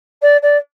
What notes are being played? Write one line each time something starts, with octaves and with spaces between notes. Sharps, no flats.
D5
D5